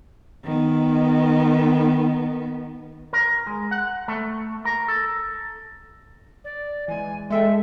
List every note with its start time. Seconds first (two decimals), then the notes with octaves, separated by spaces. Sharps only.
0.45 D#3 B3
3.13 A#4
3.47 G#3
3.71 F#5
4.08 A3
4.65 A#4
4.88 A4
6.44 D5
6.88 E3 G#3 G#5
7.30 G#3 A4 E5 G5